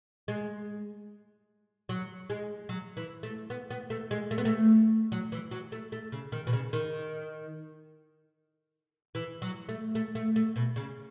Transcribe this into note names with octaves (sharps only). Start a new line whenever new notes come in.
G#3
F#3
G#3
F#3
E3
A3
B3
B3
A3
G#3
A3
B3
A3
F#3
E3
F#3
A3
A3
C#3
D#3
B2
C#3
D#3
E3
F#3
A3
A3
A3
A3
B2
C#3